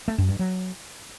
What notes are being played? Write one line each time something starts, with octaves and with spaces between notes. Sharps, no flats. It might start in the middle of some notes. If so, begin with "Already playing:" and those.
A3
F#2
G2
F#3